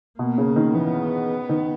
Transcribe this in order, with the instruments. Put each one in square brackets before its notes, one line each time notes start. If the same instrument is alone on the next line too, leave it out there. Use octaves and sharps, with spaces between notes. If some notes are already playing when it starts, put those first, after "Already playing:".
[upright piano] B2 [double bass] A#3
[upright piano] C#3
D#3
[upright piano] E3 [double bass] B3
[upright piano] D#3